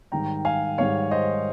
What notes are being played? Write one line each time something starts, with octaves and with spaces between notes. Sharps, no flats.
G#2 D#3 G3 G5 A#5
F5 G#5
G#2 D#3 G3 C#5 F5
C5 D#5